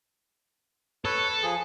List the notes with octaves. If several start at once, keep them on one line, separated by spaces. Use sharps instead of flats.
A4 B4 C#5
F3 G#4